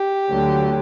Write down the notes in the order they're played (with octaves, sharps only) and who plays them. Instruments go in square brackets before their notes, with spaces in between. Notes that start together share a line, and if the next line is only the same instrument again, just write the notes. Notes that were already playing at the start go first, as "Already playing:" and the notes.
Already playing: [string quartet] G4
D2 D3 F#3